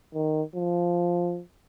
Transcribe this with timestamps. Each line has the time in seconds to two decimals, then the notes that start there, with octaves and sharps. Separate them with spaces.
0.14 D#3
0.55 F3